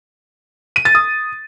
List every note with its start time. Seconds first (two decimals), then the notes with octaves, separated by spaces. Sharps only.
0.76 D#7
0.85 A6
0.95 D#6